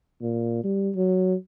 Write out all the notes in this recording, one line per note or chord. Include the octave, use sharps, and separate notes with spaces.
A#2
G3
F#3